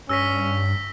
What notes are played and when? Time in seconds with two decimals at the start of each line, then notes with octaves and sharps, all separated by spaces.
0.09 G2 C#4 E6 A#6 B6